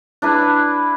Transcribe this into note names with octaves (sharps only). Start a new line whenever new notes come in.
D4 E4 B4